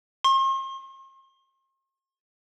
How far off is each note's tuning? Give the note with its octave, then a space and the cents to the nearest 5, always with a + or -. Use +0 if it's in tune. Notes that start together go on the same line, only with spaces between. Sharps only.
C6 +45